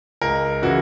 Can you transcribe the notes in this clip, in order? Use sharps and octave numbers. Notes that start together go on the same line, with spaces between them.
C#2 A#4
C#3 E3 F#4